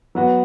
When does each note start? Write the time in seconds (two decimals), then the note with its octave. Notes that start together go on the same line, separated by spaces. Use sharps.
0.15 F#3 B3 F#4